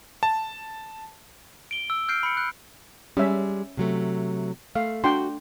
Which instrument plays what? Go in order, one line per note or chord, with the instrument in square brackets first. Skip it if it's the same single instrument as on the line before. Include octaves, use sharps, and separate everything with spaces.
[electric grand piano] A5
[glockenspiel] D7 G7
E6
F6 G6 C7 D7
B5 C#7
F#6
[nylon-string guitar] G3 G#3 [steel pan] C#4 E5
[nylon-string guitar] C3 F#3 A3
[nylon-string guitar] A3 [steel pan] F5
[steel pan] D4 G5 C6 [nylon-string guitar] F#4